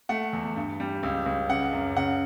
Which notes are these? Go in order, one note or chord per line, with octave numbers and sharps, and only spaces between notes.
A3 F#5
E2
G2
G3
C#2
C#2
C#3 F#5
F#2
C#3 F#5